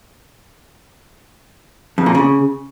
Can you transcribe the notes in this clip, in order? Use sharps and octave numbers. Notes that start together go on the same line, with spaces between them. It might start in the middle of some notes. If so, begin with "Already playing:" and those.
F2
A#2
C#3